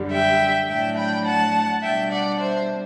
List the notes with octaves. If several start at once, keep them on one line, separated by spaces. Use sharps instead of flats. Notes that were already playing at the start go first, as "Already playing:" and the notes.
Already playing: F#2 D3 G3
E5 G5
A2 F#3 A3 D4 E5 G5
G5 B5
F#5 A5
B2 G3 D4 E5 G5
D5 F#5
C5 E5